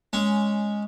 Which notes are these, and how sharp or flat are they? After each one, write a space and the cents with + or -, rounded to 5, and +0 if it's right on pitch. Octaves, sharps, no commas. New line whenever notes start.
G#3 +0 C#4 +5